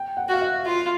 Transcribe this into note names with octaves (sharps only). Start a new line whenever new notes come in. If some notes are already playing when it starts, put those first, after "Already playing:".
Already playing: G5
F#5
F#4 F5
E5
F4 F5